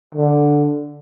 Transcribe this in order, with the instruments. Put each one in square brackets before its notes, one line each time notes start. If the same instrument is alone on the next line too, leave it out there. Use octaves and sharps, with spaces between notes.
[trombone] D3